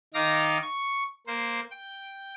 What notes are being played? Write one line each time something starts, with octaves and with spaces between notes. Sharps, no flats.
D#3 D#4 F5 D6 A#6
C#6
A#3 C5
G5